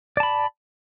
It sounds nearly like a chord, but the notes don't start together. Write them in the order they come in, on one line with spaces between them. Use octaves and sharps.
D5 A5 B5